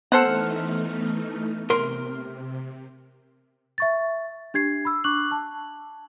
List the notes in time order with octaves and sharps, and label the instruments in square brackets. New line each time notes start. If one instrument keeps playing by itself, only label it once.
[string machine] E3 A3 D#4 [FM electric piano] B3 F6 [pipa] A4 C5 F#5
[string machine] C3 [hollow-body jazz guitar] A#4 C6
[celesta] E5 C#6 A6
D4 G4 G#6 C7
B5 E6
D4 C#6 D6 F#6 F#7
A5